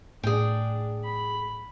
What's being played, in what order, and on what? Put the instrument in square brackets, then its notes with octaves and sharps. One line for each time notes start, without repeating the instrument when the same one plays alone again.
[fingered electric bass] A2 [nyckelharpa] D4 [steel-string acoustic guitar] G#4 G5
[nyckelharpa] B5